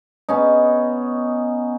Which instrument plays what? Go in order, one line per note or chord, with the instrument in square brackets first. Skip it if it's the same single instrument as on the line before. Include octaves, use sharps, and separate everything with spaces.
[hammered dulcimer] B3 C#4 D#4